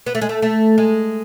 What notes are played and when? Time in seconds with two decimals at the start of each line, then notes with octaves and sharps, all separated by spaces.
0.06 B3
0.15 A3
0.21 G#3
0.29 A3
0.42 A3
0.78 G#3